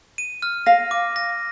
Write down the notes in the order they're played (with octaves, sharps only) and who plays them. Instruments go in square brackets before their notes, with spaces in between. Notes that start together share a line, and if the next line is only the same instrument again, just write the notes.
[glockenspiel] D#7
F6
[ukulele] F5 [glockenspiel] A#6
[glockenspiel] D6
A#6